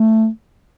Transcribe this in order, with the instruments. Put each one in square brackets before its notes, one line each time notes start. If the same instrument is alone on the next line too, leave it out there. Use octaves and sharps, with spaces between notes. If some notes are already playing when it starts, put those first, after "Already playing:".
Already playing: [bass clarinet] A3